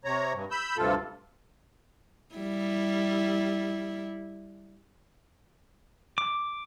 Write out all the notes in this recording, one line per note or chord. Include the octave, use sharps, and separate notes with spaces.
C3 C#5 A#5
G2
B5 E6 G6
D2 G2 C3 F4 A4
G3 E4
D6